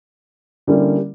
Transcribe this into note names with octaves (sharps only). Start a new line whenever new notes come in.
D3 G3 A#3 C#4 E4